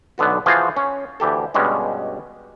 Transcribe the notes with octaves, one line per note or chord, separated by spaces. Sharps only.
B1 D3 B3 F#4
E3 F3 F4 F#4 G#4 C5
C#4
D2 E3 G4 A4
G2 B2 G3 G#3 C#4